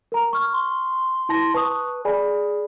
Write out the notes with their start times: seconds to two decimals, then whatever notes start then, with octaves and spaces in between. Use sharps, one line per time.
0.12 A#4 A#5
0.33 C#6 F6
0.53 C6
1.29 E4 A5 A#6
1.54 B4 A5 C#6 D#6
2.05 G#4 D5 G#5 B5